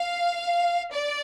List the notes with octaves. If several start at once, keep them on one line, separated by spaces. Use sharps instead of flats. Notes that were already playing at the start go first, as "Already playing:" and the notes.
Already playing: F5
D5